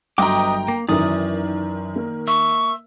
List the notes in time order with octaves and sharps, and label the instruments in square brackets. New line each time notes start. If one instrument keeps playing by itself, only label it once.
[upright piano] G1 F#3 C6 [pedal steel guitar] B4 D#5 D6 [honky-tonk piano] G5 A#5
[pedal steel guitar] A#3
[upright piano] F#2 E3 [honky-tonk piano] D#3 [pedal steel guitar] D5 D#6
[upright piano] A#3 A#4
[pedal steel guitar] E5 [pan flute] C#6